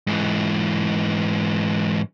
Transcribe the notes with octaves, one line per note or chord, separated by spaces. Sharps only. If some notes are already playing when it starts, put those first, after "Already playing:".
G#2 E3